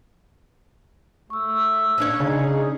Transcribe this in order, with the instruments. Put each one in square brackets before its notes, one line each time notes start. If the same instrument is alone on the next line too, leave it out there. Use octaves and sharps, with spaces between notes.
[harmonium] A3 [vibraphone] C#6 E6
[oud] C#4 D4 C#5
[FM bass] C#3 [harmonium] D#4 G#4 [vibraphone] D5